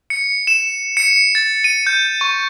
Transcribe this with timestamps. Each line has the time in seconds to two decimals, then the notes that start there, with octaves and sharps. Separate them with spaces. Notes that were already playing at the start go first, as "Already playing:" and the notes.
0.10 C#7
0.47 E7
0.97 C#7
1.35 A6
1.64 D#7
1.87 G6
2.21 C#6